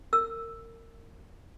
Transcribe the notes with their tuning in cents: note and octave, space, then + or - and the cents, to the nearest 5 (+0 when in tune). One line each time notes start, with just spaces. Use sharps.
A#4 -30 E6 +0